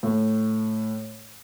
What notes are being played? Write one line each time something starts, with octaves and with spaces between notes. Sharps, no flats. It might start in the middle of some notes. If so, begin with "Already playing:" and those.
A2